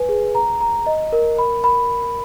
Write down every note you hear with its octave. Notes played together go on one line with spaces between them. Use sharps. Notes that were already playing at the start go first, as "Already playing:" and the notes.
Already playing: B4 G#5
G#4
A#5
A#5
D#5
A#4
B5
B5